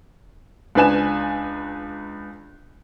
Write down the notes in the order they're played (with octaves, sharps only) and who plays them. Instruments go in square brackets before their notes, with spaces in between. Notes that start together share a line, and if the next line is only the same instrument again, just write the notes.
[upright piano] C#2 D4 B4 G#5 E7